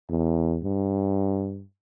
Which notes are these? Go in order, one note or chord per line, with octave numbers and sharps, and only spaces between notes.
E2
G2